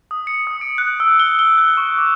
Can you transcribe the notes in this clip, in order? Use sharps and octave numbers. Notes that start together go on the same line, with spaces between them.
D#6
C#7
D#6
D7
F#6
E6
G7
G7
F#6
C#6
D6